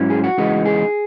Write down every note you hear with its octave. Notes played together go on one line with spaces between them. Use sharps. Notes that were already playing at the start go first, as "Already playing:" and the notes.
Already playing: G#2 F#3 C#4 E4
G#4
F#4
E2 C#3 E3 G#3 D#4
G#4